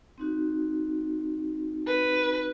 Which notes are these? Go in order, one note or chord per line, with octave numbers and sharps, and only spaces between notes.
C4 D#4 F#4
B4